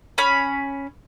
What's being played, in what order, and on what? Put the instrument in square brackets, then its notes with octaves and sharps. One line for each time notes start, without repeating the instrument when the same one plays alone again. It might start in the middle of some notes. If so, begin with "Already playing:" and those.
[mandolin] C#4 B5